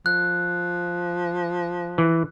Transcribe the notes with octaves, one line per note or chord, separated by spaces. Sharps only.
F3 F#6
E3